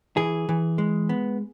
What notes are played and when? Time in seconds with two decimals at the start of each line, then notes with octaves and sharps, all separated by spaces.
0.17 E3 G#4
0.49 E3
0.78 G#3
1.09 B3